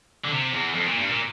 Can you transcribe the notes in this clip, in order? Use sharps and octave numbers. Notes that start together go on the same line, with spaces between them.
D3
C3
E2
F2
A#2
G2
A#2